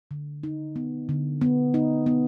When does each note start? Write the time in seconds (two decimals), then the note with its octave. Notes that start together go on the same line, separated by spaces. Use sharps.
0.11 D3
0.43 D#4
0.76 B3
1.09 D3
1.41 B3
1.74 D#4
2.06 B3